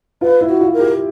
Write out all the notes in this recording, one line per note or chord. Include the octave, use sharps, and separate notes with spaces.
F4 B4
E4
F#4
F4
A#4
G4